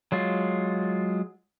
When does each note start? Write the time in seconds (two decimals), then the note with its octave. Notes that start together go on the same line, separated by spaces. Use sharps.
0.12 F#3 G#3 F4